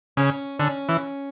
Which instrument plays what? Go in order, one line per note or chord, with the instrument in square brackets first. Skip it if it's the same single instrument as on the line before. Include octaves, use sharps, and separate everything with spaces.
[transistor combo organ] C#3 [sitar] C#4
[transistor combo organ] D3 [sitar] C#4
[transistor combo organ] E3